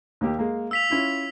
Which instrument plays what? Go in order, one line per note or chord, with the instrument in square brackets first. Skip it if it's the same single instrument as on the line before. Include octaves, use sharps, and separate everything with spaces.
[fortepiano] D#2 A#3 G4
G#3 A#3
[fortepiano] F5 [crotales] E6 B6 F7
[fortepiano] C#4 E4 F4